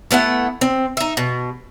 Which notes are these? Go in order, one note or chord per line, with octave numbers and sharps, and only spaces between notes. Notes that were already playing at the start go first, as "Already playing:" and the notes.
A3 B3 E4 F#5
C4
D#4 E5
B2